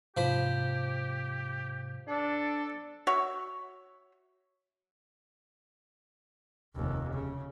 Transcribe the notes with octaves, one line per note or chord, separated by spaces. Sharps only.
G#2 C3 F3 G4 C5 B5
D4 A4
F#4 C#5 E5
F1 D#2
C#3